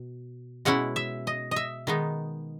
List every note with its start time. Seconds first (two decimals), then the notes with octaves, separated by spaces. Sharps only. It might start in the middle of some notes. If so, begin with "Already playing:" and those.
Already playing: B2
0.65 B2 G#3 C#4 E4 F#5
0.96 E5
1.27 D#5
1.51 D#5 E5
1.87 D#3 G#3 B3 D#4